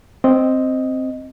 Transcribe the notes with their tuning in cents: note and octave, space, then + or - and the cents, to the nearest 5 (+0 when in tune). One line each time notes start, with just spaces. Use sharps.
C4 +0 D#5 +0